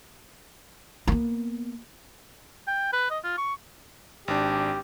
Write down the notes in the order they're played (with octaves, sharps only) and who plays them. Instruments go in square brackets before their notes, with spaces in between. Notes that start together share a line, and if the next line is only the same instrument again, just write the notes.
[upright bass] A#3 B3
[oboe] G5
B4
D#5
F4
C#6
[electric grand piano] G#1 D4 [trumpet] G4